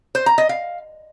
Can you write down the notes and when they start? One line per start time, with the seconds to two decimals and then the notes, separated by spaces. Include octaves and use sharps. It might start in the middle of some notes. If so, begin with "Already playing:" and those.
0.15 C5
0.26 A#5
0.38 D#5
0.49 F5